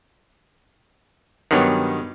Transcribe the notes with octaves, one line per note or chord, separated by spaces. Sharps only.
G2 D#3 F#3 B3 C#5